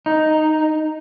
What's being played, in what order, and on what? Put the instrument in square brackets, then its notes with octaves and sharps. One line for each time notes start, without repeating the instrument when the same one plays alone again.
[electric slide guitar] D#4